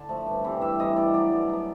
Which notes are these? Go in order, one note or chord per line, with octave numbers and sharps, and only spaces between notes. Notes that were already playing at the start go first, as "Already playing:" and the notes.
Already playing: D3 A5
F3 A3
G2
E3 G3 C4
G2 E5
E3 G3 C4 D#5
B2 D5
F#3 B3 D5
B2
F#3 B3